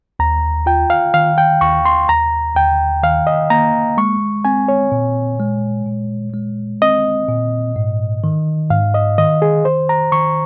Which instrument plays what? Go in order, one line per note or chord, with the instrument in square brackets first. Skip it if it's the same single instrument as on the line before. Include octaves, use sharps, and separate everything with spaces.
[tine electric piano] D#2 [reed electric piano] A#5
[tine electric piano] F4 [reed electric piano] G5
[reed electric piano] F5
[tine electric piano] D#3 [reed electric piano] F5
[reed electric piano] G5
[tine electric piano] D#2 [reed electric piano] C#6
[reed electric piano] C6
[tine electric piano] D#2 [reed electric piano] A#5
[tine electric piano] D#2 [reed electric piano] G5
[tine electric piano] D#3 [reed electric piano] F5
[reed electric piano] D#5
[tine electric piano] A#3 [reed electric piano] A#5
[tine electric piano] G#3 [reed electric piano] C#6
[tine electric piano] C4 [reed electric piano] G#5
[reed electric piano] C#5
[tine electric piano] A#2
G#3
A#2
G#3
[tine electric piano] C4 [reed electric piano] D#5
[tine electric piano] A#2
G#2
D#3
[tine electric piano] G#2 [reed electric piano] F5
[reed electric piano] D#5
[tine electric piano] D#3 [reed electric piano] D#5
[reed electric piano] G#4
[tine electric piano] D#3 [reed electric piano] C5
[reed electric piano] A#5
[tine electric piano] D#3 [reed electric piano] C#6